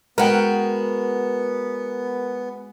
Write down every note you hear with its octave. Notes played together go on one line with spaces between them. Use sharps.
G#3 B3 F#4 A#4 B4 F#5 G5